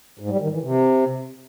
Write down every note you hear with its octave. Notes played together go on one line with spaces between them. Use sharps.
G#2
G3
D#3
E3
C3